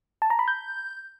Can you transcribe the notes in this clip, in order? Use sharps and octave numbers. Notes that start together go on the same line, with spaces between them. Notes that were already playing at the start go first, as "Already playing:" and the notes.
A5
A#5
B5
G6